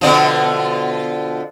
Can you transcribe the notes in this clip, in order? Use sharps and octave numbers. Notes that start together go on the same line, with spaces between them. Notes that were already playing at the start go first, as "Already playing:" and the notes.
B2 D3 F3